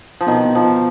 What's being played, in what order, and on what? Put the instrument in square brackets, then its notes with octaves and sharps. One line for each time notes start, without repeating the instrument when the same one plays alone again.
[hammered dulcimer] F3
[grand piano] B2 [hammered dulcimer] D#3
[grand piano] B2
[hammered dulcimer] F3
[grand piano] B2